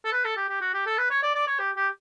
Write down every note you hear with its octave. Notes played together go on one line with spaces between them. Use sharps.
A4
B4
A4
G4
G4
F#4
G4
A4
B4
C#5
D5
D5
C#5
G4
G4